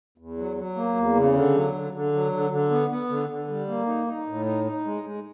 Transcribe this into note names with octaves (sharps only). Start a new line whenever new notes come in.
E2
F#3
F#3
A#3
E2
C#3
D3
F#3
D3
D3
F#3
D3
D3
B3
B3
D3
D3
G3
A#3
D#4
D#4
A2
D#4
D#4
G#3
G#3